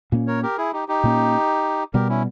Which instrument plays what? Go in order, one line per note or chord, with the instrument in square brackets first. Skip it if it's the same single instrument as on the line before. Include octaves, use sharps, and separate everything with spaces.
[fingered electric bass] A#2 A#3 C#4
[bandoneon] A#4 C#5
G4 A#4
E4 G#4
D#4 G4
D#4 G4
[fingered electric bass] A#2 A#3 C#4
[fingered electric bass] B2 G3 B3 [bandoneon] G4 A#4
[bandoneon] C#4 E4